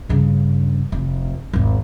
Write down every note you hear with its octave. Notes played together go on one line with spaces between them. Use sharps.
G2 C#3
F1
G#1 E2